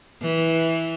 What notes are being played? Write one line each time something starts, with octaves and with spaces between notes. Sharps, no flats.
E3